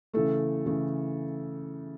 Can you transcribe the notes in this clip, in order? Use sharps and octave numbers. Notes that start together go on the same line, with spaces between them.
C#3 E3 A3 A4
C#3 E3 A3